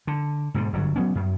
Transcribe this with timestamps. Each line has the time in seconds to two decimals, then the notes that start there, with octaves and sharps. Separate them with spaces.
0.07 D3
0.54 G#2 B2 D3
0.73 G1 D3 F#3
0.96 F#3 B3 C#4
1.15 F#2